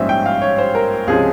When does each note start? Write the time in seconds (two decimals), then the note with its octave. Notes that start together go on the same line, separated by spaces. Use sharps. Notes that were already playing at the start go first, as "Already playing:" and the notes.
Already playing: A#1 G#2 G3 C#4 C5 E5
0.09 G5
0.26 F5
0.42 C#5
0.58 C5
0.75 A#4
1.07 C#2 C3 F3 G#3 C#4 G#4